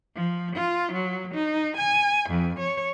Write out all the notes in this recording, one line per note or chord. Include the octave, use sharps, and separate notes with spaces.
F3
F4
F#3
D#4
G#5
F2
C#5